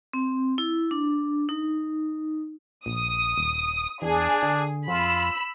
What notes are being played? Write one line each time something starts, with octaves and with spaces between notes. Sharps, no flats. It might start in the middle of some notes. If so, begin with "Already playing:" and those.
C4
E4
D4
D#4
A#1 D#6
D#1
E2 D4 G#4
D3
F2 F4 B5 E6